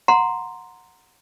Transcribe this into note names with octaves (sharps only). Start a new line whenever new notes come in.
F#5 A#5 C6